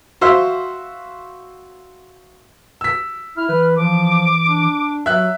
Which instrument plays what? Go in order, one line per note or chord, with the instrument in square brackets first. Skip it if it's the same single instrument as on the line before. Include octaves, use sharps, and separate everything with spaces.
[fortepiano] F#4 C5 E5 F5 C6 E6
[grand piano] E6 B6
[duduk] E4 [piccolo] F6
[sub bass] E3 [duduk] B4
[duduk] F3 [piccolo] D6
[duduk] D4
[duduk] F#3 [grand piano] E5 F#6